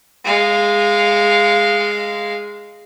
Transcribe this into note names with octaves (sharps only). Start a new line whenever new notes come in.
G#3 F5